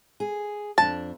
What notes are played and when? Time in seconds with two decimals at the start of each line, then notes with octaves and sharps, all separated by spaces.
0.20 G#4
0.78 F2 D4 A5